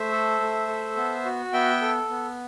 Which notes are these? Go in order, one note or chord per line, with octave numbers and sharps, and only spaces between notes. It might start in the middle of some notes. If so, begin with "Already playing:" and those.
Already playing: A3 C5 E5
A4
A3
A4
B3
F#4
B3 E5 G5
A4
B3